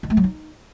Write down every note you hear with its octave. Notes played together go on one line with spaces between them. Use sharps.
D#3
A3
F#3
D#4